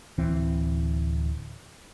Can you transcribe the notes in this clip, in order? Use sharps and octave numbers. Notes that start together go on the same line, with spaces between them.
D1 E3 C4